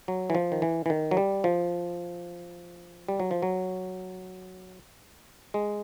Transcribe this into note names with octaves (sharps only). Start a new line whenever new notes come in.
F#3
E3
F3
D#3
E3
E3
D#3
F#3
G3
F3
G3
F#3
F3
F#3
G#3